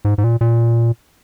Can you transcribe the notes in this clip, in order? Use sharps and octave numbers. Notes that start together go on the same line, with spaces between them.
G#2
G#2
A#2
A#2